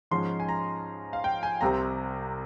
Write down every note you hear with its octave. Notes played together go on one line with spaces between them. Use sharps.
G#2 F3 G#3 C#4 C6
G#5
A#5
F5
G5
G#5
C2 C3 G3 C4 A#5